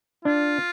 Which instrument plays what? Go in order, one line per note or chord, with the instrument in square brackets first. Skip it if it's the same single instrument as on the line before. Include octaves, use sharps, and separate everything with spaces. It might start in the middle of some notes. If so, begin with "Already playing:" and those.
[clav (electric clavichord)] D4 [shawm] F4